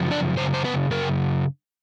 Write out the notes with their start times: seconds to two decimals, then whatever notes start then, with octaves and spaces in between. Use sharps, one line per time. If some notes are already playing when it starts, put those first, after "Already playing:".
Already playing: F#2 C#3 F3
0.11 D4 D5
0.37 F#2 C#3 C5
0.54 C5
0.64 B3 B4
0.91 F#2 C#3 A#4